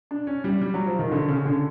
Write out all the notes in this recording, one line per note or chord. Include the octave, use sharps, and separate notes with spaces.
D4
C#4
G3
G3
F#3
F3
D#3
D3
C#3
D3